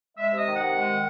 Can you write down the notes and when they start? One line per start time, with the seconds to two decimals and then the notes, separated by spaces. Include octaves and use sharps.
0.17 G#3 E5
0.31 C3 D#5
0.46 D#3
0.56 C3 F#5
0.75 G#3
0.89 D#3